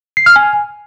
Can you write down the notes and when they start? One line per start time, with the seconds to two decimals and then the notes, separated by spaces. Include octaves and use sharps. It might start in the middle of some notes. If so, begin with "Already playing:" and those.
0.17 C7
0.26 F6
0.36 G#5